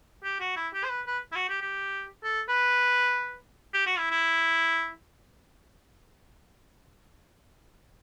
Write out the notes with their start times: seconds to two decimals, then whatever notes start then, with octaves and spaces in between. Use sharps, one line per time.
0.24 G4
0.40 F#4
0.57 E4
0.74 G4
0.84 C5
0.90 B4
1.07 B4
1.32 E4
1.36 F#4
1.49 G4
1.61 G4
2.24 A4
2.49 B4
3.74 G4
3.86 F#4
3.98 E4
4.11 E4